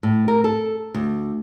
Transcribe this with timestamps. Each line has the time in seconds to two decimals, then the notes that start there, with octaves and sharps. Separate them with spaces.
0.03 A2
0.28 A#4
0.44 A4
0.94 D2